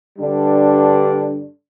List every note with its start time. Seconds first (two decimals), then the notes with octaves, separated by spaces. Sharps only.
0.18 G2 D3 G3 D4